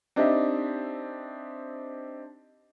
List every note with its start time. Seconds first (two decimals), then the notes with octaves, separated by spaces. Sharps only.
0.16 C4 D4 D#4 G4 D#5 E5